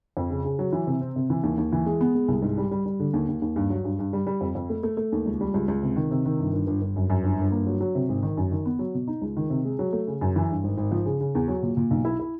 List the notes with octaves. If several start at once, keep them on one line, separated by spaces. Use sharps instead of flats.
F2
C#3
C#3
F#3
E3
C3
C4
C3
E3
D#2
D#2
E3
G#3
B3
G#3
C2
G#2
G3
G3
G3
D3
D#2
D#2
D#2
G2
F#3
G2
G2
G3
G3
F2
F2
A3
A3
A3
D#2
C#2
G3
C#2
C#2
C3
D#3
C3
D#3
G1
G1
G1
G1
F#2
F#2
G1
G1
A#3
F#3
F#3
C3
G#1
D#3
F#2
D#3
B3
F#3
B2
D#4
C#2
D#3
C3
G#3
F#3
A3
C#3
F#2
E3
G2
G#1
G#1
F3
C#3
C#3
E2
F#3
A#2
A#2
B1
E4
E4